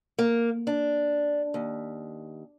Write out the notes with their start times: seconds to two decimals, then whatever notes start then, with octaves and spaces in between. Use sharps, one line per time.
0.19 A#3
0.67 D4
1.54 D#2